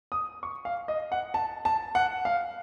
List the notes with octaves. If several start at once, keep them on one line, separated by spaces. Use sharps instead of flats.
D#6
C#6
F5
D#5
F#5
A5
A5
F#5
F5